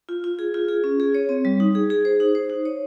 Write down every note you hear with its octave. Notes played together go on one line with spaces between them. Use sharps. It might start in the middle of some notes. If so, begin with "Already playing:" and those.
F4
F4
G#4
F4
G#4
C#4
G#4
C#5
C4
G3
D#4
G#4
G#4
C5
D#4
C5
D#4
C#5